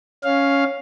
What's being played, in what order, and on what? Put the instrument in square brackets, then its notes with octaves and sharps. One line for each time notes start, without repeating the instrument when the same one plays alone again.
[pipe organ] C#4 F5